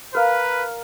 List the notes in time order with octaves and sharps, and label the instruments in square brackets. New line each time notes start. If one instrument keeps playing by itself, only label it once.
[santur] A#4 F5 [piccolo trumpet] B4